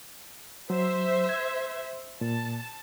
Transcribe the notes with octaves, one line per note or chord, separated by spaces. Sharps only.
F#3 C5 E5
G#6
A#2 A5